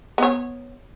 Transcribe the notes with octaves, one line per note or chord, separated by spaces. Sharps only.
B3 C#5